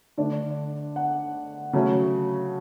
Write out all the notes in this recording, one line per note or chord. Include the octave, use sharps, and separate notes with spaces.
D3 A3 D4 D5
F#5
C#3 F#3 A3 C#4